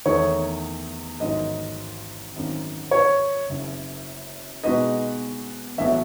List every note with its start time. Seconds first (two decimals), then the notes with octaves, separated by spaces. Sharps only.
0.05 E2 D#3 A3 D#4 C#5
1.20 A1 G#2 D#3 F#3 D#5
2.34 G#1 F#2 D#3
2.91 C#5
3.49 F#1 F#2 C#3
4.64 B2 G#3 D#4 F#4 B4 D#5
5.78 A1 A2 F#3 B3 F#4 E5